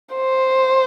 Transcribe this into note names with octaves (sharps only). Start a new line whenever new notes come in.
C5